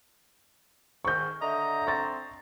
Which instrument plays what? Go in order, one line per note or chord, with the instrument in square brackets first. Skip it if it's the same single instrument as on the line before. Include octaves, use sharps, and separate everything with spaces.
[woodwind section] G#2 D#3 [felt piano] C#6 G6
[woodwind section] D3 A#5 [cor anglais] D#5 [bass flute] E5
[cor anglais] C4 [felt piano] C#6 A6